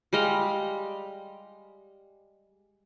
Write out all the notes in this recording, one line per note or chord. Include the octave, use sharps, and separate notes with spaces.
G3 G#3 D#5 F5